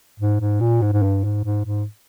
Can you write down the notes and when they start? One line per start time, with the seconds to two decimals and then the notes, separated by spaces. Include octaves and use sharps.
0.20 G#2
0.40 G#2
0.60 A#2
0.82 G#2
0.93 G#2
1.03 G2
1.24 G#2
1.44 G#2
1.65 G#2